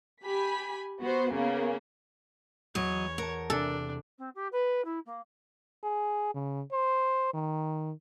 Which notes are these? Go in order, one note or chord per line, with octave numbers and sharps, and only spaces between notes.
G4 G#5 B5 B6
B3 F#4 C5
C#3 A#3 B3
E2 F#3 C#5 D#5 B5
A#4 F#5 A5
C3 C4 D4 A4
C4
G4
B4
E4
A#3
G#4
C#3
C5
D#3